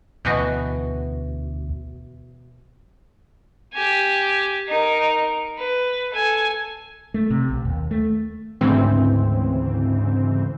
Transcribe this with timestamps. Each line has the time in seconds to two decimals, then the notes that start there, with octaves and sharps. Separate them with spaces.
0.25 D2 B2 E3 F#4
3.74 G4 G#5
4.68 D#4 A#4
5.58 B4
6.11 A4 G#5
7.14 A3
7.30 C3
7.50 B1
7.65 D#2
7.91 A3
8.61 D2 G#2 C#3 E3 C4